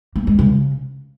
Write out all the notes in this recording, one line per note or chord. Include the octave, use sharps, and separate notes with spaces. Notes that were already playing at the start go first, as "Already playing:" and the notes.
A#3
G#3
C#3